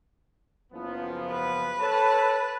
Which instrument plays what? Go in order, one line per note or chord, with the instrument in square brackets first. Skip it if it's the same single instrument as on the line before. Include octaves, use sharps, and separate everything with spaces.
[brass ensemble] F#1 F3 B3
[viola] B4
[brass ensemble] A4 C#5 A5